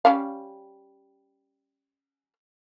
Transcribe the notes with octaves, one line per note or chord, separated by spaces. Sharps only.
G3 C#4 F5